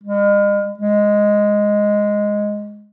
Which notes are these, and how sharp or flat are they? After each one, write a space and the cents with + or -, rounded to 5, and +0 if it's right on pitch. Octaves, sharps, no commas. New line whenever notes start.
G#3 -40
G#3 -5